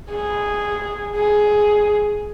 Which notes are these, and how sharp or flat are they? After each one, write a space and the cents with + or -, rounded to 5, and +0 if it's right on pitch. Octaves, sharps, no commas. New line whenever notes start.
G#4 -10
G#4 +10